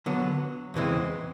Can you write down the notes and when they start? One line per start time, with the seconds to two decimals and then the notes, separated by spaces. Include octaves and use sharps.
0.06 D3 F#3 B3
0.74 E2 C#3 E3 G#3 C4